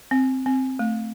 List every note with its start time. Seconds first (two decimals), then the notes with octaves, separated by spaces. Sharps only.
0.11 C4
0.46 C4
0.79 A3